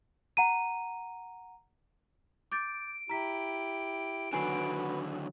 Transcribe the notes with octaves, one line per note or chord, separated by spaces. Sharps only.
F#5 A#5 D#7
D6 G6 A6 D7
E4 G4 A#5 B6
D3 D#3 F#3 F#4 B4 G#5 C7